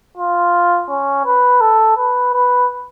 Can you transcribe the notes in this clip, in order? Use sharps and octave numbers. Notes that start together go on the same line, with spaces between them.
F4
C#4
B4
A4
B4
B4